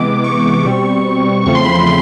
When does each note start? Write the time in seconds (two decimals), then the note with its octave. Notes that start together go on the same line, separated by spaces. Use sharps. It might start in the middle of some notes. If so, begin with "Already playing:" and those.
Already playing: C3 E3 G#3 B3 D6
0.24 C#6
0.65 B2 G3 C4
1.46 E2 C#3 F3 A3 C4 C#6
1.55 C6
1.64 B5
1.73 C6
1.87 C6